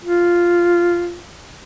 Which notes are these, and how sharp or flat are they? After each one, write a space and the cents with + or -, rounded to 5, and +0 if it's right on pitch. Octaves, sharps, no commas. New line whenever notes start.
F4 -5